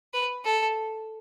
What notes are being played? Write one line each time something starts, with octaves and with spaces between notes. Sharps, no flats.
B4
A4